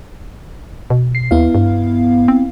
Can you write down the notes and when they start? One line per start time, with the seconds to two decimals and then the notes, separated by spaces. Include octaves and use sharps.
0.90 B2
1.15 C7
1.31 D#2 B3 E4 F5
1.55 G2
2.28 C4